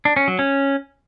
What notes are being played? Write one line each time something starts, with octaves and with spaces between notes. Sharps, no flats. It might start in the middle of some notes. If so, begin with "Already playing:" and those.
D4
C#4
F#3
C#4